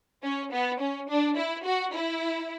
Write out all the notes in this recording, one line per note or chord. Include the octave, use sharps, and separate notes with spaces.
C#4
B3
C#4
D4
E4
F#4
E4